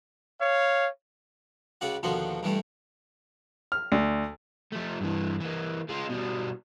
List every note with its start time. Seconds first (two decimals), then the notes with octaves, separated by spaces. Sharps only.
0.40 C#5 F5
1.81 C#2 C#3 F#4 D5 F#5
2.03 D#2 B2 D3 F3 F#4 C5
2.43 G2 E3 G3 A3
3.72 F6
3.92 D2
4.72 F3 A3
5.01 G2 E3
5.41 E3 A#3
5.89 G#3 F4
6.10 B2 G3